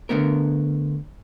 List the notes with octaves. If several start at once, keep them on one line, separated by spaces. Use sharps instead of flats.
D3 A3 B3 A#4